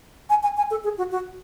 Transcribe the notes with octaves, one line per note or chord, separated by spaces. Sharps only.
G#5
G#5
G#5
A4
G#4
F#4
F#4